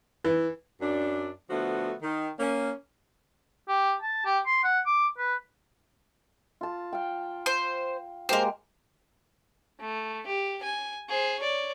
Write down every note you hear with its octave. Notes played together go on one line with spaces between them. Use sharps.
E3
F#2 D4
D3 F3 A3 B3 F#4
D#3
A#3 C#4
G4
A5
G4
C6
F#5
D6
B4
F4 A5
F5 G5
C5
G#3 A#3 G4 A#4 C5
A3
G4
G#5
G#4 C5
C#5 D5